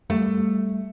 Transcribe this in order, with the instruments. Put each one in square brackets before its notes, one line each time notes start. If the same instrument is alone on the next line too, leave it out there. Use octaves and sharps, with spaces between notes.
[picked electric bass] G3 [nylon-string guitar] A3